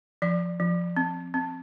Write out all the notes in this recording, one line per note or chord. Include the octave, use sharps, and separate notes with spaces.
F3 D5
F3
C4
C4